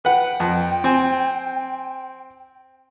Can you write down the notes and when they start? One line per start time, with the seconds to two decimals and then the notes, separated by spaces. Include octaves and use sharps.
0.05 B4 F#5 G5
0.40 F2
0.84 C4 G#5